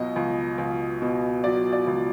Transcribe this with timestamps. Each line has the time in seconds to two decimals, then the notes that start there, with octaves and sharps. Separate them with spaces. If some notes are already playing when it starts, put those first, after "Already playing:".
Already playing: C#2 B2 F#3 D#5
0.16 C#2
0.58 C#2
1.02 B2
1.44 F#3 D5
1.73 D5
1.87 C#2